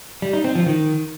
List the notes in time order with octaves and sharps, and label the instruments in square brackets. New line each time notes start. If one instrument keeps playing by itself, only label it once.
[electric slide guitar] G3
D#4
C4
F3
D#3